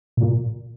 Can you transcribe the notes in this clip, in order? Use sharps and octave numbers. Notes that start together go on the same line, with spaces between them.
A#2